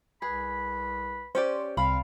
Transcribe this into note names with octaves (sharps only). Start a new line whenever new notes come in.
C2 G#4 B4 B5
C#4 G4 C5 D5
C2 C4 D5 F5 B5